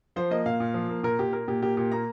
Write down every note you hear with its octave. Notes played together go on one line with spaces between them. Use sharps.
F3 C5
A#3 D#5
A#2 F5
A#2
F3
A#3
A#2 A#4
A#2 G4
A#3 A#4
A#2 G4
A#3 G4
A#2 G4
A#3 A#5